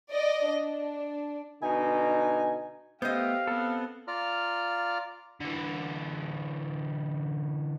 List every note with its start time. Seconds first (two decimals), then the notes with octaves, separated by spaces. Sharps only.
0.12 D5 D#5
0.49 D4
1.62 B2 D3 D#4 G#5
3.02 A3 B3 G4 C5 D#5 F5
3.47 B3 C4 A4
4.08 F4 D5 A#5 F6
5.40 D3 E3